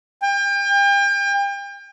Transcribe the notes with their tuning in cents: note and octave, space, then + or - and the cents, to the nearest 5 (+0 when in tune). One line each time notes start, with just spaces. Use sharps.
G5 +35